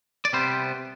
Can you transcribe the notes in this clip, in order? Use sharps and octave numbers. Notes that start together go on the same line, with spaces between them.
D5
C3 G3 B3 C5